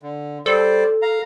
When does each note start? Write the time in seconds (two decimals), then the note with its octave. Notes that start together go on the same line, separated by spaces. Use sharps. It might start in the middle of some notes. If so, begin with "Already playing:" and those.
0.02 D3
0.46 G3 A4 C5 D5
1.02 F5 A#5